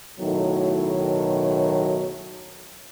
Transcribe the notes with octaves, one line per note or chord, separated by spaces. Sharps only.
B1 A2 D#3 F#3